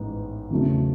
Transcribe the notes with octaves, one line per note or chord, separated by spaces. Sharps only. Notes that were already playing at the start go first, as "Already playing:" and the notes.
Already playing: A1 G#2 E3 B3 D#4
E2 C#3 F#3 A3